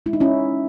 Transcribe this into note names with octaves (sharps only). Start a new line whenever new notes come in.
G#3 E4
D#4
C#4 E4